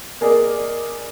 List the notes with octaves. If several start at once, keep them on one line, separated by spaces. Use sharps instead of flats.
A#3 G#4 A#4 D5 D#5